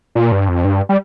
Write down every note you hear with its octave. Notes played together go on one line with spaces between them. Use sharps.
A#2
G2
F2
G2
G3